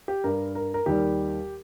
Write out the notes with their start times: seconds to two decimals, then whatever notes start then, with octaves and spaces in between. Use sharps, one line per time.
0.08 G4
0.24 G2 G3 A#4
0.55 A#4
0.74 A#4
0.86 D#2 D#3 G3 G4